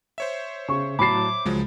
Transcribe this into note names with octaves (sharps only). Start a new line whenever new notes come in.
C5 C#5 E5
C#3 C#6
A2 F#3 A5 B5 D6 C7
C#2 F3 F#3 G#3